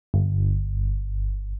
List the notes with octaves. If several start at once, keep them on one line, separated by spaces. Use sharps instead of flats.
G1